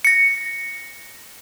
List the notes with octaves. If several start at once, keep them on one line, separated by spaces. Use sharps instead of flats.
A#6 C#7